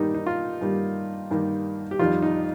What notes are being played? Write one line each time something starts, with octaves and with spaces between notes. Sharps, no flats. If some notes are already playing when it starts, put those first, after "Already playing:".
Already playing: G2 D#3 G3 A#3 D#4
D#4
F4
G2 D#3 G3 A#3
G2 D#3 G3 A#3
G4
F2 D#3 G3 F4
D#4